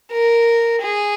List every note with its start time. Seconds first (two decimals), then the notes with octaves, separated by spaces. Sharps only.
0.12 A#4
0.83 G#4